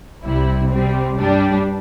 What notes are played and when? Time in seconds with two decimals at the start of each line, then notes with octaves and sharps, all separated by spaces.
0.24 C2 C3 G3 E4
0.71 C3 G3 C4
1.18 G2 G3 D4